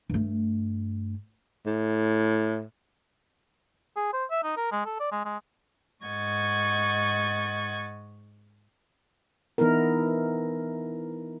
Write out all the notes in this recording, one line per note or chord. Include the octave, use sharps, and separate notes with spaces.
G2 A3
A2
G#4
C5
E5
D#4
A#4
G#3
A4
D5
G#3
G#3
G#2 D#5 F#5 C#6 G#6 A6
E3 B3 D#4 E4 A#4